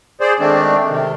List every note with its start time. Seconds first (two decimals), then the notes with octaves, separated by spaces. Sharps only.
0.21 G#4 C5 D5
0.40 D#3 G#3 A3 C4 D4
0.89 C3 D#3